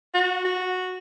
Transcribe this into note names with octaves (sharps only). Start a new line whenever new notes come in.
F#4
F#4